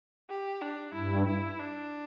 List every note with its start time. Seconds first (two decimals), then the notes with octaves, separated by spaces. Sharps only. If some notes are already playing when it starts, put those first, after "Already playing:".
0.29 G4
0.61 D4
0.94 G2 E4
1.27 E4
1.59 D4